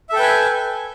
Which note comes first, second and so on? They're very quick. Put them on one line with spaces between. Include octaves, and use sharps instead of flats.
E5 A4 G5 B4 G#5